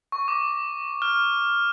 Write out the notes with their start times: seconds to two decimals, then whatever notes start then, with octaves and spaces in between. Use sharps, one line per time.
0.12 C#6
0.28 D6
1.02 F6